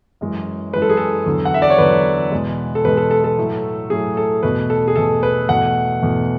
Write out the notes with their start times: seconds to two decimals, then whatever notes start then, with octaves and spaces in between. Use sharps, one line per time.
0.21 F#2 E3 G#3
0.73 F#2 E3 G#3 B4
0.82 A4
0.90 G#4
0.97 A4
1.26 E2 D3 F#3
1.45 F#5
1.54 E5
1.62 D5
1.70 C#5
1.78 E2 D3 F#3 B4
2.32 E2 B2 G#3
2.75 A4
2.85 E2 B2 G#3 B4
2.97 A4
3.11 A4
3.24 A4
3.38 A2 F#3 A3
3.90 A2 F#3 A3 G#4
4.17 A4
4.43 E2 B2 A3 B4
4.70 A4
4.88 G#4
4.96 E2 B2 A3 A4
5.23 B4
5.49 E2 B2 A3 F#5
6.02 E2 B2 A3